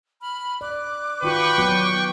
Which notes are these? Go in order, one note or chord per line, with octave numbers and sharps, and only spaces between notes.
B5 F6
D5 D6 F#6
D#3 F4 F#4 B4 G5 C#6
F#3 B3 F#4